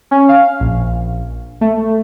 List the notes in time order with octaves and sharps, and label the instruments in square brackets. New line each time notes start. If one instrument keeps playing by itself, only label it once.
[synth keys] C#4
F5
A#1
A3